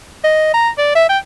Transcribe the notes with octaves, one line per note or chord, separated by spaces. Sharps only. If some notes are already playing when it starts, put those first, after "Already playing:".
D#5
A#5
D5
E5
G5